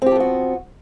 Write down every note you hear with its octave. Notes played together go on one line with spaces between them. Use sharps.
F3 B3 C4 F#4 G4